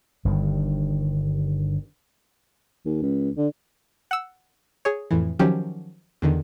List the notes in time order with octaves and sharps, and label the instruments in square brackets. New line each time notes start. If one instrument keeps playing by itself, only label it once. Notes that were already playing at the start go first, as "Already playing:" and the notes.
[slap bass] G1 G2 D#3
[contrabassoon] D#2
C#2
D3
[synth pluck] F#5 E6
G#4 C#5
F2 A2 E3
D#3 F3 F#3 C#4 G4
E2 D3 D#3